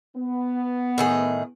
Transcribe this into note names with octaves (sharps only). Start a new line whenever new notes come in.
B3
A2 D#3 G#4